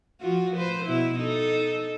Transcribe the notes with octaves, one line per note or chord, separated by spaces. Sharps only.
F3 F4 F#4
B4 C5
B2 E4
D#4 A4